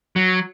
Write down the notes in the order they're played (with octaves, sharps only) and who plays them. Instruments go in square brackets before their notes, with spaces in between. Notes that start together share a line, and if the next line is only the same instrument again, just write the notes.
[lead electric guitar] F#3